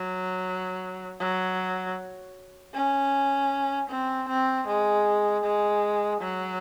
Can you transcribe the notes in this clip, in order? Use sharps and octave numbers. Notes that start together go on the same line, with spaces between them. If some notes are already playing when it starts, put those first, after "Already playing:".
Already playing: F#3
F#3
C#4
C4
C4
G#3
G#3
F#3